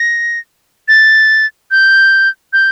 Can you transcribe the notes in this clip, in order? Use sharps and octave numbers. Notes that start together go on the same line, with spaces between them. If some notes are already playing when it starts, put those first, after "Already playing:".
Already playing: A#6
A6
G6
G6